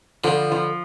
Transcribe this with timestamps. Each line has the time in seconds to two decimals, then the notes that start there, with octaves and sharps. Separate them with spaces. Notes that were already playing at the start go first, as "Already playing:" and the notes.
0.24 D3 F3
0.52 F3